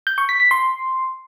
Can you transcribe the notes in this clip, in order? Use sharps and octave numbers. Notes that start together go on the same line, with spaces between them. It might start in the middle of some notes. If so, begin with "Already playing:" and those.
G6
C#6
B6
B6
C6